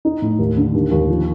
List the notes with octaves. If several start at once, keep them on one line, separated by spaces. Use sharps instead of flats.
D#4
A2
D#2
D3
D#2
D#2
F3